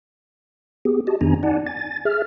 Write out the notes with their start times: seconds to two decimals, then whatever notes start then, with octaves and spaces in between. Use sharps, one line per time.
0.85 B3 G4 G#4
1.07 F#4 G4 D#5 A5
1.21 F2 D#3 B3 D4 G#5 A#5
1.43 D#4 D5 F#5 G#5 A5
1.66 G#5 A6
2.05 G#4 E5 F6